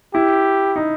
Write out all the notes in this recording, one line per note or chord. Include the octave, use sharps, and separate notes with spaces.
E4 G4
D#4